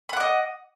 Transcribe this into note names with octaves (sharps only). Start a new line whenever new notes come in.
D#5 F#5 B5 D6